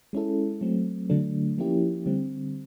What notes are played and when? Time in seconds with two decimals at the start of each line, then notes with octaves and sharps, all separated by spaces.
0.13 G#3 C#4 E4 A4
0.61 F#3 A3 C4
1.10 D3 F#3 A3 D4
1.58 F3 A#3 C#4 E4 G4
2.06 D3 G3 C4